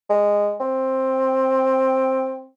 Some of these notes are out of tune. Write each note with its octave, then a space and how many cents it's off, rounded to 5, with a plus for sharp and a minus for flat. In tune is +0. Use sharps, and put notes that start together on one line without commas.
G#3 -15
C4 +10